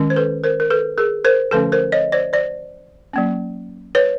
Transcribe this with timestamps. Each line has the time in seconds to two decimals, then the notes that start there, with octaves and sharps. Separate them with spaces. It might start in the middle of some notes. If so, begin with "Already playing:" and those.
Already playing: D#3 G#3 C#4
0.10 C5
0.16 A4 B4
0.44 A#4 C5
0.60 A#4
0.70 A4 B4
0.98 G#4 A#4
1.25 A#4 C5
1.51 D3 F3 A3 C#4 A4 B4
1.72 A#4 C5
1.92 C#5 D#5
2.12 C5 D5
2.33 C5 D5
3.13 F#3 A#3 C#4
3.95 B4 C#5